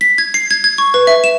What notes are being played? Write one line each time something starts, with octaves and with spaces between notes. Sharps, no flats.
B6
G#6
C7
G#6
G#6
C#6
B4
E5
E7